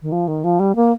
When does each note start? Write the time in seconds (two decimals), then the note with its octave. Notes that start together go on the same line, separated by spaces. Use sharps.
0.02 D#3
0.12 F3
0.28 D#3
0.44 F3
0.60 G3
0.76 A#3